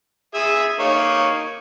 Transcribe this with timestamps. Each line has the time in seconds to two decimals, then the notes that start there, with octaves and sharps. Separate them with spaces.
0.34 G#4 E5 E6
0.79 A#3 D#4 C#5